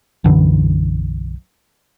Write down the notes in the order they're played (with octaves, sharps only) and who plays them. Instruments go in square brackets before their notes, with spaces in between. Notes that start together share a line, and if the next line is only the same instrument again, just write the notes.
[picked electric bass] B1 F#2 D3 E3